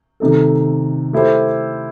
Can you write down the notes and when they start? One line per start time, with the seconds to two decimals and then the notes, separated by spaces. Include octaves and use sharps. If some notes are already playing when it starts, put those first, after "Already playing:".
0.20 C3 D#3 A3 D#4 A4
1.13 A3 E4 G4 C5